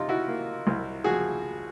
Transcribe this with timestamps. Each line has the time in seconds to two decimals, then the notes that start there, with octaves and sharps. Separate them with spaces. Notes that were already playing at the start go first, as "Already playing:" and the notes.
Already playing: C3 F3 D#4 F4
0.09 E4 F#4
0.28 A#3
0.67 C2
1.04 F3 F#4 G#4